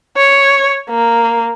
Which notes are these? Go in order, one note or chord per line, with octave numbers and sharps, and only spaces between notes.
C#5
A#3